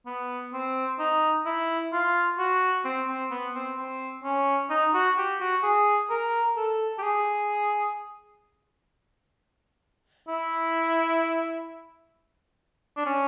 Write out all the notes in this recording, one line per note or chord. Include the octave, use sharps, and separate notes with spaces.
B3
C4
D#4
E4
F4
F#4
C4
C4
B3
C4
C4
C#4
D#4
F#4
G4
F#4
G#4
A#4
A4
G4
G#4
E4
D4
C#4